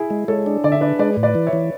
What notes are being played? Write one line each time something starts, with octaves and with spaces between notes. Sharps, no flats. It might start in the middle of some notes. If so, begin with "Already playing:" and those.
Already playing: E4 G#4
G#3
G#3 A4 C#5
D4
D3 D5
E5
D4 B4 D5
G#3 B4 D5
A2
B4 D5
E3
C#5 E5
E3